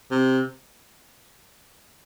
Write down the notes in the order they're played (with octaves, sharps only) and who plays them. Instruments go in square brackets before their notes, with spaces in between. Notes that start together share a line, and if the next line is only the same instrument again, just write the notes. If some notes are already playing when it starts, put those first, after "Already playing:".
[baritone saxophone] C3